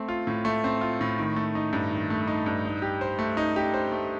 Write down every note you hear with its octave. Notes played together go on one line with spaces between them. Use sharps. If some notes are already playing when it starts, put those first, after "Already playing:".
Already playing: A3 C4
F4
A2
A3
C4
F4
A2
D#3
A3
D#4
G2
D#3
A3
D#4
G2
D#4
G4
C5
A3
D#4
G4
C5
A3